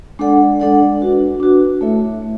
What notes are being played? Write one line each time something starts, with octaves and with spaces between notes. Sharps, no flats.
G#3 D4 A4 D5 F#5
G#3 D4 A4 D5 F#5
D4 F#4 B4
D4 F#4 B4
A3 E4 A4 C#5 E5
A3